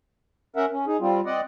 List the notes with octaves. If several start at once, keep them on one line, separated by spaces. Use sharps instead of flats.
C#4 A#4 E5 F#5
C#4
D#4 G#4
G3 C4 F4
C4 D5 D#5 F#5